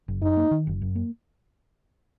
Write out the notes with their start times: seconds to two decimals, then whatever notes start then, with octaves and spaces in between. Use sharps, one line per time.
0.08 F#1
0.22 F#2 D#4
0.37 A#3
0.51 D#3
0.67 F#1
0.82 F#2
0.95 A#3